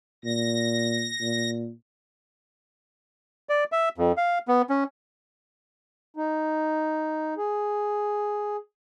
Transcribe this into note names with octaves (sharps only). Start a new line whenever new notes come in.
A#2 A#6
A#2
D5
E5
F2
F5
B3
C#4
D#4
G#4